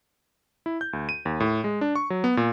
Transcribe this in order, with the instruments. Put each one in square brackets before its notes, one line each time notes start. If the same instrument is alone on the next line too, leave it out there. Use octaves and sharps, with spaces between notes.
[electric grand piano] E4
G6
D2
D#7
D#2
A2
G#3
D4
C#6
F#3
B3
A#2